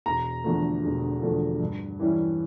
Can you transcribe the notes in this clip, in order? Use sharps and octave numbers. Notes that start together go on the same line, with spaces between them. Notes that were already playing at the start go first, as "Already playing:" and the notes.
E1 A#5
E2 D3 F3 A3
E1
E2 D3 F3 A3
G2
E3 G3 C#4 E4